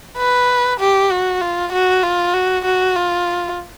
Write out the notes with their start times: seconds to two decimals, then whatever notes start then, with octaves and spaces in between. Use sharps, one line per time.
0.18 B4
0.80 G4
1.11 F#4
1.41 F4
1.72 F#4
2.03 F4
2.34 F#4
2.65 F#4
2.96 F4